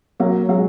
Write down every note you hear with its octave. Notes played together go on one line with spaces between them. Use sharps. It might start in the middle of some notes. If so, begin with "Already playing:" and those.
F#3 A#3
F#3 G#3